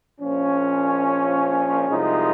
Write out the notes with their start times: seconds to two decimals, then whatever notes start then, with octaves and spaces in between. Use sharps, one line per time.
0.21 A#1 A#2 F3 C#4
1.88 C2 C3 F3 G#3 D#4